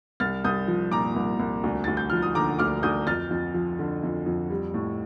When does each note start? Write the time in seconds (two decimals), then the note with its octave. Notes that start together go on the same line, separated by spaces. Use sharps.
0.20 C2 F6 A6
0.44 C2 D#6 G6
0.68 F3
0.91 A#2 A#5 D6
1.16 C2
1.39 C2
1.64 D2
1.84 D2 A6
1.97 G6
2.10 F3 F6
2.22 D#6
2.35 D3 A#5 D6
2.59 D2 D6 F6
2.83 D2 D#6 G6
3.07 F2 F6 A6
3.31 F2
3.54 F3
3.79 D3
4.03 F2
4.26 F2
4.50 G3
4.74 A2